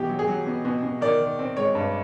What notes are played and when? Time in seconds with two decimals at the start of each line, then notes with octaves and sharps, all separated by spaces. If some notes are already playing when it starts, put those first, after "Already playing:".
Already playing: B2 E3 G4
0.09 F#3
0.19 G#4
0.28 F#3
0.47 B2
0.65 B2
0.83 B2
1.01 D#3 D5
1.21 D#3
1.39 C4
1.57 G#3 C#5
1.75 G2